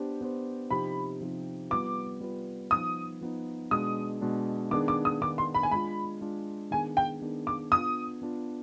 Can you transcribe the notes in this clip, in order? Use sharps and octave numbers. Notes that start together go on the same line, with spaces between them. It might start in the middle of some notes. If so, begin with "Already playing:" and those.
Already playing: B3 D4 G4 C5
B3 D4 G4 C5
C3 F3 C4 D#4 G4 B5
C3 F3 C4 D#4 G4
G3 B3 F4 B4 D6
G3 B3 F4 B4
F3 B3 D#4 D#6
F3 B3 D#4
B2 G#3 D4 D#6
B2 G#3 D4
D#3 B3 D4 G#4 D6
D6
D#6
D#3 B3 D4 G#4 D6
C6
B5
G#5
G#3 D4 F4 B5
G#3 D4 F4
D#3 B3 D4 G#4 G#5
G5
D#3 B3 D4 G#4
D6
B3 D4 F4 D#6
B3 D4 F4